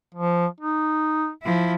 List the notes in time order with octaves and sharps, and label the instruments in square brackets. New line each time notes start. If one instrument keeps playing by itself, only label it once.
[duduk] F3
D#4
[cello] F3 E4